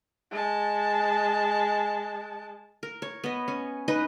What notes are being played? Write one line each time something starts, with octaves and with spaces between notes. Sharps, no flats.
G#3 A5
A#4
C#5
B3 D#5
C#4
D#4 B4 D#5